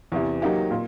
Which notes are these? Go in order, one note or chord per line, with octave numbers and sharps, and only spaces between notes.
E2 C3 E3
F#3 A#3 D#4 G4
A#2